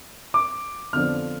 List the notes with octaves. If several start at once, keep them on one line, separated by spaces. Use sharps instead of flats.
D6
F2 D3 F3 B3 D4 F6